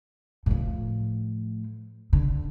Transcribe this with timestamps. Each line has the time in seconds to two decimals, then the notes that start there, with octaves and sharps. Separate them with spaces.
0.46 A2 F3
2.13 D3